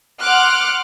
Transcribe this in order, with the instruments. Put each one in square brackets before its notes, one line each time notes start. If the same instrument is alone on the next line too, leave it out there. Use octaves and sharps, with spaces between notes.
[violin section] F#5 C6 D6 F6 F#6